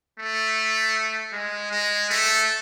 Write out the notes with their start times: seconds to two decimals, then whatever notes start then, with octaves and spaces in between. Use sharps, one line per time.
0.19 A3
1.33 G#3
1.71 G#3
2.10 A3